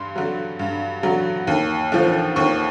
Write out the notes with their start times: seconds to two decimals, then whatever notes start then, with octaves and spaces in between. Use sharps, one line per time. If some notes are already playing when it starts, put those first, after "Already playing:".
Already playing: G2 C6
0.16 D3 F#3
0.59 G2
1.03 D3 F#3
1.47 D#2
1.92 D3 F3
2.36 D#2 C#6